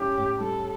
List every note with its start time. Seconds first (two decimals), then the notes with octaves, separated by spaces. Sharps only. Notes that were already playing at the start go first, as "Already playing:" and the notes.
Already playing: A2 G3 C#4 E4 G4
0.17 A2
0.40 G3 A4